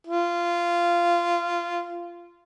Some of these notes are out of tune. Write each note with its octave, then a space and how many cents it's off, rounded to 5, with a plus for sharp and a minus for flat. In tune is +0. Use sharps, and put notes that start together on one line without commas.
F4 -15